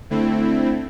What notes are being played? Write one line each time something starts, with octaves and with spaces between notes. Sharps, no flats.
D3 A3 C4 E4